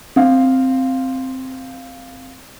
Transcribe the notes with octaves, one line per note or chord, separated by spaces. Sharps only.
C4 F5